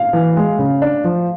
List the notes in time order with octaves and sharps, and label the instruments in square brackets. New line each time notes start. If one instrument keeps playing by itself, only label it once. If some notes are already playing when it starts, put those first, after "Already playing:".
Already playing: [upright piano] F5
[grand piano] E3
G#3
C#3
D4
F3